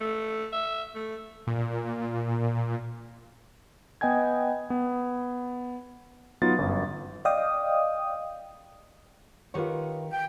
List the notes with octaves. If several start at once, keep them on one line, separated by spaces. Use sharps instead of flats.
A3
E5
A3
A#2
B3 D#5 G5 G#5 G#6
B3
F#3 B3 D#4 F4 A6
G1 F#2
D5 D#5 F5 G5 D#6
D#3 F4 G4 B4 C#5 F#5
G5